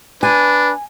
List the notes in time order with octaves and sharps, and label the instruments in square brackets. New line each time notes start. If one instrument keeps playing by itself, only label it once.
[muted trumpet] D4 [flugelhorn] B4 [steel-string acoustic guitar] G#5